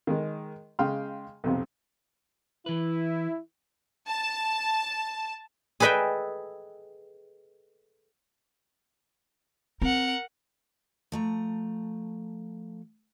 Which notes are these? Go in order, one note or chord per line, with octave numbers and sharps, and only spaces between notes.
D#3 G#3
C#3 G#3 F5 G5 C6 F6
B1 F2 C3
E3 E4 B4
A5
G#4 A4 B4 D#5 E5 G5
C4 A#4 F#5
F3 A3 A#5